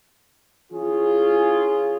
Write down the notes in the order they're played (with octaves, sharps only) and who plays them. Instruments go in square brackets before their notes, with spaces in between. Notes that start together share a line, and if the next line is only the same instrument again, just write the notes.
[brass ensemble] E3 C#4 F4 [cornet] G#4